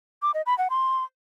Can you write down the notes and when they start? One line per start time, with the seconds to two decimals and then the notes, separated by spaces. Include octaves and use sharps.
0.22 D6
0.34 D#5
0.46 B5
0.58 F#5
0.70 C6